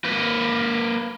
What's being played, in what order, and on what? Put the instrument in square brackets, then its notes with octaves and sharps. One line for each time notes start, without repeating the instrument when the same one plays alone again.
[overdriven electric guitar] A#3 B4